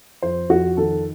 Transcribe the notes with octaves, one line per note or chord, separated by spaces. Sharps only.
F2 C5
F2 F#4
D#3 A4